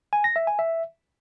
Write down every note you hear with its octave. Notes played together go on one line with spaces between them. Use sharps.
G#5
A#6
E5
G#5
E5